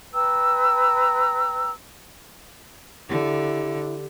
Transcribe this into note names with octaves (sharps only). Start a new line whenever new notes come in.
B4 G5 A#5 E6
D3 E4 G4